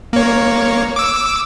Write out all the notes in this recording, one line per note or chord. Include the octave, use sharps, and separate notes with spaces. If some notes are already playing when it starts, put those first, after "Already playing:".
A#3 C#5
D6 E6